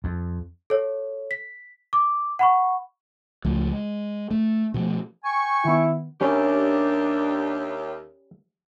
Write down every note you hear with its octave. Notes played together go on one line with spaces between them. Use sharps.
F2
A4 C#5
B6
D6
F#5 B5 C#6
C#2 F3 A3
G#3
A3
B2 F3 A3
G5 G#5 C#6
D#3 B3 E4
D#2 G3 C#4 D4 G4 A#4 C#5 E5